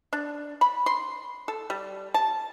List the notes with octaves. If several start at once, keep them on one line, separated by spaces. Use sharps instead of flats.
D4
B5
C6
A4
G3
A5